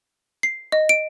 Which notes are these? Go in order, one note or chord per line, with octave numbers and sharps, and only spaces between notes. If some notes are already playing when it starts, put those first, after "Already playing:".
C7
D#5
D7